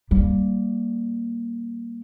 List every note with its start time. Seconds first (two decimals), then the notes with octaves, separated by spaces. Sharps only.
0.11 G3 A#3